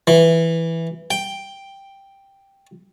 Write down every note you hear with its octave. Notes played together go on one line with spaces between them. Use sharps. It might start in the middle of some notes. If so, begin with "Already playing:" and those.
E3
G5